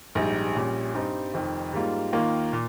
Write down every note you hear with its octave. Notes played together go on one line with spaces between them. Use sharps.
A#1 G#2 G3
A#1 A#2 G3 C#4
G2 G3 C4 D#4
F1 F2 D#3
G#2 G3 A#3 F4
D#2 D#3 A#3 F4
A#2